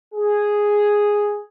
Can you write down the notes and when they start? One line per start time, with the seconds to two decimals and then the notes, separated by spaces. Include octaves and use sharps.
0.14 G#4